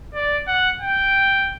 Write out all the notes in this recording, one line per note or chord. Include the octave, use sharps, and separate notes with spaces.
D5
F#5
G5